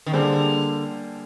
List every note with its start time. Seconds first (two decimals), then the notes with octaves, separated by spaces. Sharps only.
0.06 D#3
0.13 D3 G3 A#3 D4 G#4 C5